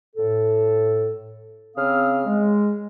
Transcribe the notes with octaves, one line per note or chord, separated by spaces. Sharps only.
A2 A4
C#3 C4 F5 D#6 F6
G#3